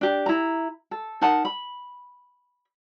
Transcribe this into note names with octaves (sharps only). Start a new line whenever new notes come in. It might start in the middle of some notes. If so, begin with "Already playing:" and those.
D4 G4
E4 A#5
A4
D#4 A#4 F#5 A5
B5